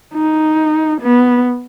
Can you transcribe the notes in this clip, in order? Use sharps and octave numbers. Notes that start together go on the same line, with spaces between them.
D#4
B3